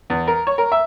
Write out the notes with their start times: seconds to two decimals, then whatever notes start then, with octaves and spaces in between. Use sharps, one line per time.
0.10 E2
0.27 A#4
0.47 C#5
0.58 A#4
0.72 E5